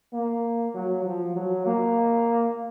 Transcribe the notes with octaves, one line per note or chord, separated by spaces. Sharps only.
A#3
F#3
F3
F#3
A#3